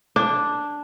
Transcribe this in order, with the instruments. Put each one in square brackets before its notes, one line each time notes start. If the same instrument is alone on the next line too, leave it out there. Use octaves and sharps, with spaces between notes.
[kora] D4